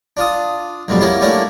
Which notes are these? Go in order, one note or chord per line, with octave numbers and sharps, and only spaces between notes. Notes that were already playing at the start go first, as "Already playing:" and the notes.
D4 F4 D#6
B1 F2 G#2 B2 G3
A#3 B3 C#4 E4 G4
G3 A3 A#3 C#4 D4 E4